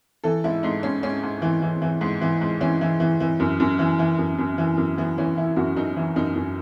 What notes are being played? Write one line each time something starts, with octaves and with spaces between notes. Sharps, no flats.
E3 A4
G#2 E4
G#2 D#4
G#2 C#4
G#2 C#4
G#2
E3
E3
E3
G#2
E3
G#2
E3 C#4
E3
E3
E3
F#2
F#2
E3
E3
F#2
F#2
E3
F#2
E3 B3
E3 C#4
E3 E4
F#2 F#4
F#2 D#4
E3
F#2 D#4
F#2